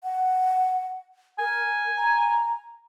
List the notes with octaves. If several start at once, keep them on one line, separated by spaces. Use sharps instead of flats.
F#5
A#4 G#5
A#5